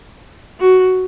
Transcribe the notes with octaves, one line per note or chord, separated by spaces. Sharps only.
F#4